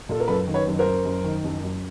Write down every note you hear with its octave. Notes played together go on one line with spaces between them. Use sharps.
A#2 A4
A#4
F#1 A4 B4
D#3
B4 C#5
F#1
A#4 C5
F#2
F#1
D#3
F#1
F#2